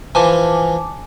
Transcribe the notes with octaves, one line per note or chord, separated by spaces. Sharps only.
E3 F3 G#5 A5 D6